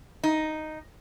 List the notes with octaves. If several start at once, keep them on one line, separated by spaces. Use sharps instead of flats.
D#4